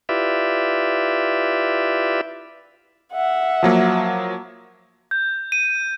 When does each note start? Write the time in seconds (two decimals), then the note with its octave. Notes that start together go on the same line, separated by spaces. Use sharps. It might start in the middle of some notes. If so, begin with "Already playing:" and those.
0.09 E4 F4 G4 B4 D5 E5
3.13 E5 F#5
3.63 F3 F#3 A#3
5.11 G6
5.52 D#7